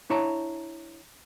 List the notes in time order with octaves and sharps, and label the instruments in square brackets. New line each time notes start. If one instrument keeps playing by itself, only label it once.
[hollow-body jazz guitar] D4 E4 C#5 A5 A#5